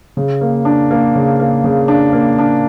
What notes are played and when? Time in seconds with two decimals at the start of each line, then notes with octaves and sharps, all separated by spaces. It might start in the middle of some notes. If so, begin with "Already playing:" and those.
0.17 C#3
0.41 A#3
0.65 D4
0.91 A#3
1.15 C#3
1.40 A#3
1.64 C#3
1.88 D4
2.13 A#3
2.38 D4